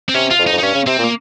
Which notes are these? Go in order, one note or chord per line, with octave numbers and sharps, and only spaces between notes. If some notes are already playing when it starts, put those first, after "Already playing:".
C4
C3 C#4
F4
F2
D#4
F2
D#4
G2 C#4
C#3
C3 C4
A#2
A#3